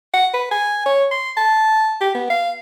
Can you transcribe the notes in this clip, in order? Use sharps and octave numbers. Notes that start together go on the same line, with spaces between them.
F#5
B4
G#5
C#5
C6
A5
G4
B3
F5